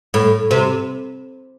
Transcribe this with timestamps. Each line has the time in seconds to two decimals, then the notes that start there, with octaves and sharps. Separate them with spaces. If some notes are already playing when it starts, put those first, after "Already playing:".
0.14 A2
0.51 C3